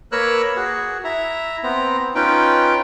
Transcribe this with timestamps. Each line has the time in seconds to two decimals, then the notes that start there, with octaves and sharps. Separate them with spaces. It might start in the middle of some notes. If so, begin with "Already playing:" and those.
0.12 A#3 A#4 B4 C#5 E6 F#6
0.56 F#4 G#4
1.04 E4 E5 A#5
1.63 B3 C4 A#5
2.15 C#4 D#4 F4 B4 G5